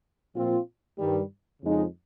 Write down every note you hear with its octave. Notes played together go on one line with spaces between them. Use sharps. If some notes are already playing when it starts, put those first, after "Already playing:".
A#2 F3 C4 F4
G2 D#3 G3
F2 C#3 F3 G#3 D#4